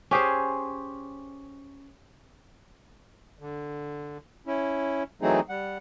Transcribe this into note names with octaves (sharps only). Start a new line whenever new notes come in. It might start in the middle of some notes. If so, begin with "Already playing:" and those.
C#4 G4 G#4 C5
D3
C#4 E4
E3 F#3 A3 C4 D#4 G#4
G3 F#5